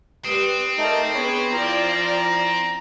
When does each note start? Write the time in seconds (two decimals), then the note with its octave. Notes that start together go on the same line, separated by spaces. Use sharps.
0.25 G3 C4 B4 D#6
0.78 A3 D#4 A#4 D5 D#5
1.15 B3 D4 G#4 C#5 B5
1.52 F3 E4 D5 A#5